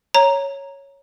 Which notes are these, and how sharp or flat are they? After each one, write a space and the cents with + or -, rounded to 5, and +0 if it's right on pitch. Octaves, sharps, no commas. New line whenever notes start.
C#5 +0 A#5 +0